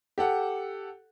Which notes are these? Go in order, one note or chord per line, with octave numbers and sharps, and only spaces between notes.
G4 A4 F#5